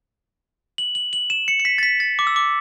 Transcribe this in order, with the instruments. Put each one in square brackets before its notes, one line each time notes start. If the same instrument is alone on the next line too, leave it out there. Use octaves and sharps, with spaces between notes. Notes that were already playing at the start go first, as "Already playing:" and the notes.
[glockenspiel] F#7
F#7
F#7
E7
C#7
C#7
B6
A6
B6
A6
D6
E6
D6